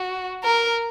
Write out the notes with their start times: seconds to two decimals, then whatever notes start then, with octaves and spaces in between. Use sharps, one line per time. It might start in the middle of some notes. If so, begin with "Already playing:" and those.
Already playing: F#4
0.44 A#4